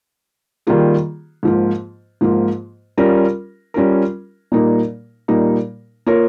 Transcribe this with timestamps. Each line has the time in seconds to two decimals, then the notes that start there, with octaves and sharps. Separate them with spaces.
0.67 D#3 G3 A#3 F4 G#4
1.43 G#2 F3 A#3 F4
2.21 G#2 F3 A#3 F4
2.98 G3 C#4 F4 A#4
3.74 G3 C#4 F4 A#4
4.52 A#2 G3 A#3 D#4 A#4
5.28 A#2 G3 A#3 D#4 A#4
6.06 A#3 F4 A#4 C#5